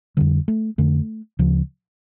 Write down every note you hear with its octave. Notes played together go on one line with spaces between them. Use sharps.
F2 D3 G3
A3
F2 D3 A3
D2 C#3 F3